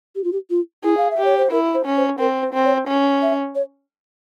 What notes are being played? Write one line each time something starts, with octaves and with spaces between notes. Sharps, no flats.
G4
F4
G4
F4
E4 G#4
F5
E5
G4
C#5
C5
E4 A#4
C5
C#4
C5
C4 A#4
C5
C4
C#5
C#4
E5
C#5